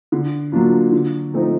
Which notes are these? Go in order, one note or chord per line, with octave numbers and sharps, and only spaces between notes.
D3
F#3 A#3 D4 F4
D3
F3 A3 C4 D#4